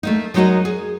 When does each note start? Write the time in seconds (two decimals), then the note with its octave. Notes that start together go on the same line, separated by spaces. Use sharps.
0.03 A3 A#3 D#4
0.34 F#3 G#3 D#4 F#4 A#4 D#5
0.65 G#4